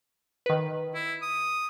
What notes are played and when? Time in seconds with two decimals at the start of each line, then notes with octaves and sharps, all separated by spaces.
0.46 D#3 B4
0.95 E4
1.22 D#6